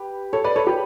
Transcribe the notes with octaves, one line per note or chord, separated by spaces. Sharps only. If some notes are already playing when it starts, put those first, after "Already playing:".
Already playing: G4 B4
A4 C#5
B4 D5
A4 C#5
G4 B4